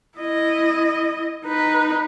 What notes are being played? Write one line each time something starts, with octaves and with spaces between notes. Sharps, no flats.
E4 D#5
D#4 B4